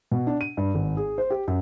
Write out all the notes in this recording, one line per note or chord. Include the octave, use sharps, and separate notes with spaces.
B2
D4
D#7
G2
G#1
G#4
C5
G4
F#2